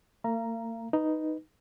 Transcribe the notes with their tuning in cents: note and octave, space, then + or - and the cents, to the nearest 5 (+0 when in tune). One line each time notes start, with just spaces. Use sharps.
A#3 -45 F5 -35 A#5 +0
D#4 +0 B4 +0